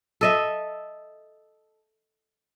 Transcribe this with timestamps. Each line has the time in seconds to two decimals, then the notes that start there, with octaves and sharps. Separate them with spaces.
0.21 A4 D#5 E5